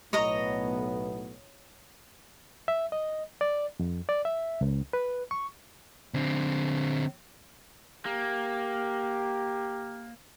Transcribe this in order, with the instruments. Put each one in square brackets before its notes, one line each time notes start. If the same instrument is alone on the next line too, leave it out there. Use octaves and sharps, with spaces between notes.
[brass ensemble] B1 A2 B3 [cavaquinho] C#5 D#5 A#5
[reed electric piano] E5
D#5
D5
F2
D5
E5
C#2
B4
C#6
[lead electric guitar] D3 C4
[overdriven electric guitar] A#3 [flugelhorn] G4